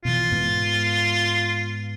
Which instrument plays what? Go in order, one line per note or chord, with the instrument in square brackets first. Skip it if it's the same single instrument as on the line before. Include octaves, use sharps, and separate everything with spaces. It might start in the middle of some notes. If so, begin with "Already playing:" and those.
[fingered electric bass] B2 E3 [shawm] F4
[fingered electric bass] G#2 B3